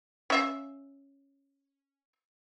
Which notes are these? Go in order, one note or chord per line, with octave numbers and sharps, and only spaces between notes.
C#4 E5 F5